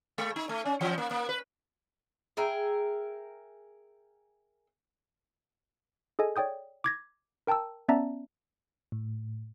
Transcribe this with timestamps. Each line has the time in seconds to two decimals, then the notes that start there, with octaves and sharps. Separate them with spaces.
0.18 G#3
0.36 D#4
0.49 A3
0.65 C#4
0.81 E3
0.98 A#3
1.11 A#3
1.29 B4
2.37 G#4 A#4 E5 G5
6.19 G#4 A4 D#5 G#5
6.36 C#5 D5 G5 D#6 G6
6.84 D6 G#6 A#6
7.47 A#4 G5 A5 A#5 E6
7.88 B3 C#4 D5 E5 A5 A#5
8.92 A2